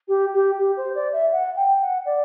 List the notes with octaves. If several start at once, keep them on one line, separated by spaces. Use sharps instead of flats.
G4
G4
G4
C5
D5
E5
F#5
G5
F#5
D5